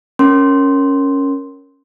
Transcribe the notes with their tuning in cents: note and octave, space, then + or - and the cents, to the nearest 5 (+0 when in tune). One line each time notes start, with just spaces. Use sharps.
C#4 +0 A#4 +0 C6 +0